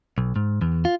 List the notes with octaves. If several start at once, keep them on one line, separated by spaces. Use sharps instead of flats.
B1
G#2
E2
F4